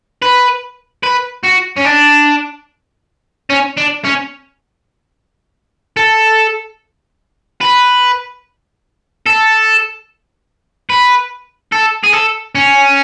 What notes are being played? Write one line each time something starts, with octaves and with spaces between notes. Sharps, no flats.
B4
B4
F#4
C#4
D4
C#4
D4
C#4
A4
B4
A4
B4
A4
G#4
A4
C#4